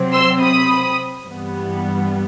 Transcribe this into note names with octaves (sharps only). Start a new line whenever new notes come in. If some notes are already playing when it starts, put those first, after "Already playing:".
Already playing: C3 F#3 C4
C6 E6
B5 D#6
G2 E3 G3 B3